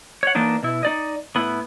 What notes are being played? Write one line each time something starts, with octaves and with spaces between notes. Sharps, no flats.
C#5 F#5
E3 A#3 B3 D4 D#4
B2 E4
D#4 D5 D#5
A2 B3 E4